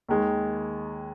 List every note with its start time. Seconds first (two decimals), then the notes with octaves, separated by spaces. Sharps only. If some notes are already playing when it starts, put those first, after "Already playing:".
0.08 D#2 D#3 G#3